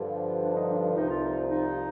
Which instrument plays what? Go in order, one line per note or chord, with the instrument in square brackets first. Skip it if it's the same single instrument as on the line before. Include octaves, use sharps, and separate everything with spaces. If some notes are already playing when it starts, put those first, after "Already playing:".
Already playing: [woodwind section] G2 D3 F3
D4
D#4
D4
C2 C3 F3 D#4
F4
D#4
D#4